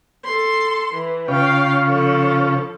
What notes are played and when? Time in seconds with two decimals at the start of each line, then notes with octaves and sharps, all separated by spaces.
0.24 A4 C6
0.93 E3
1.28 C#3 C#4 F4 F5 G5
1.86 F3 A4